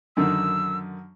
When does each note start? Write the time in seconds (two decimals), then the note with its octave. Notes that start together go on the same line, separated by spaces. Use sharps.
0.17 F#2 D3 D#3 E6